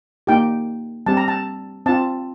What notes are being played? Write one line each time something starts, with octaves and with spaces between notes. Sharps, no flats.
A#3 D#4 G4 G5
G3 C4 G4 A5
A#5
A5
C4 F4 A5